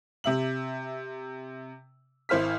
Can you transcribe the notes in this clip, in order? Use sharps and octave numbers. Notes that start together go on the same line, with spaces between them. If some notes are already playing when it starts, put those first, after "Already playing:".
C3 E5 F#7
G#1 E4 C5 F6 B6